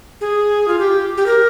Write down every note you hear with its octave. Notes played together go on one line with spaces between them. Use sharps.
G#4
F4
G4
G4
A#4